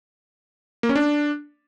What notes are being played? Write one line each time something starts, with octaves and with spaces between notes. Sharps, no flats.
A#3
C#4
D4